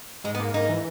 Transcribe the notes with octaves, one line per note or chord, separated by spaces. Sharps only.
G#2 G#3
B3
A#3
G#2 D#4
E3